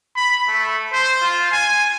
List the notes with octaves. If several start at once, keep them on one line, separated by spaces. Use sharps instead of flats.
B5
A3
C5
F4
G#5